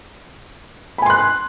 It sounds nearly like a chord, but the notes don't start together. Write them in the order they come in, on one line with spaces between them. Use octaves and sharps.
B5 G#5 C6 F#6